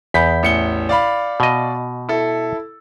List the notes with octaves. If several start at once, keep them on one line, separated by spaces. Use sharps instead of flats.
E2 B5 G6 B6
A1 C#7 G7
D5 F5 B5
B2 D#5
E4 A4